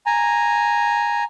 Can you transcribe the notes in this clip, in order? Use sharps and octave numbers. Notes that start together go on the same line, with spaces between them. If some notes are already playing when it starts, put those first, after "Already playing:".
G#5 A#5